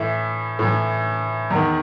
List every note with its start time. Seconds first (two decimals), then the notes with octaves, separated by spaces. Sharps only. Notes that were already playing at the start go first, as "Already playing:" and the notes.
Already playing: A2 E3 E4
0.59 A2 E3
1.51 E2 D#3